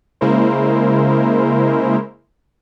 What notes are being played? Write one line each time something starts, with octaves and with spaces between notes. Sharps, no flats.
C#3 G#3 A#3 E4 A#4 C5